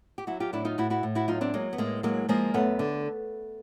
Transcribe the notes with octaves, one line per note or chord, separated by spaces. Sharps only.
G4
F#3 E4 F#4
F4 G4
A2 D4 E4
D#4 F4
A2 E4 F#4
E4 F#4
A2
E4 F#4
F#3 D#4 F4
C4 D4
F#3 G#3 A#3
B3
A2 G#3 A#3
F#3 G#3 A#3
F3 G#3 A#3
F#2 A3 B3
D3